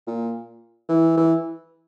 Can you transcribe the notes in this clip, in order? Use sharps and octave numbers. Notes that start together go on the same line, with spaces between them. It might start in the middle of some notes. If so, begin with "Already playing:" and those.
A#2
E3
E3